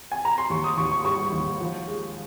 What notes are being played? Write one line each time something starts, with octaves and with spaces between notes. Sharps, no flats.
G#5
A#5
C6
D#2 C#6
D#6
D#2 C#6
C#6
G3 C#6
D#2
F3
G#3